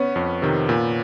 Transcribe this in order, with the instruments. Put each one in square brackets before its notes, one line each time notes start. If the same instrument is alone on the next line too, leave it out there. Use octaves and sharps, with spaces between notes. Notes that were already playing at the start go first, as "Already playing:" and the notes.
Already playing: [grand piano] B3 C#4
[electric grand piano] F2
C3 D#3
A#2